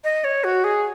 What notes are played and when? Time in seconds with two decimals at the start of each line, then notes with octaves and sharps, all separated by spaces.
0.04 D#5
0.24 C#5
0.44 F#4
0.64 G#4